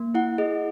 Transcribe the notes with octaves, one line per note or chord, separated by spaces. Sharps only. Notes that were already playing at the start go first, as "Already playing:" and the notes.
Already playing: A#3
E4 F#5
G#4 D#5